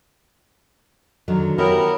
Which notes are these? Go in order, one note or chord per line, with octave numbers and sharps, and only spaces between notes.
D3 D#3 F#3
B3 C#4 E4 G4 A#4